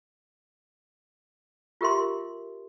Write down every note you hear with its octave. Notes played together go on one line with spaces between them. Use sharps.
F4 G4 A#4 E5 C6